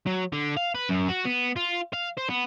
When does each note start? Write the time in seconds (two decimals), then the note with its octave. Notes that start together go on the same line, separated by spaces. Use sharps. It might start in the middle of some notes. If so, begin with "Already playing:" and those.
0.07 F#3
0.33 D3
0.57 F5
0.75 B4
0.89 F#2
1.09 F#4
1.25 B3
1.56 F4
1.93 F5
2.17 C5
2.29 B3